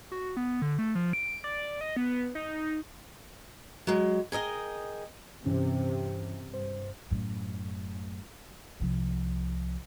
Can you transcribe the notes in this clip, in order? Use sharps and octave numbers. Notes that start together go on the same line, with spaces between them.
F#4
B3
D3
A3
F3
D7
D5
D#5
B3
D#4
F#3 G#3
G#4 A#4 D#5 G5
G2 C3 E3 C#4
G2 C5
F#2 A2
C2 F3